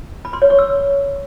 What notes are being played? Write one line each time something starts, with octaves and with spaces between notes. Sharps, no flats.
B5
C6
C#5
C#6
E6